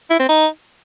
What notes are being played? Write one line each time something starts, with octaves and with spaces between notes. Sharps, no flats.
E4
C4
D#4